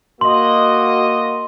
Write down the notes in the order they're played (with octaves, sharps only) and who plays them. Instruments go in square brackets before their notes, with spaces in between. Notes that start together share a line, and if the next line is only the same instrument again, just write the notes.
[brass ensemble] A#3 F#4 D#5 [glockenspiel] C6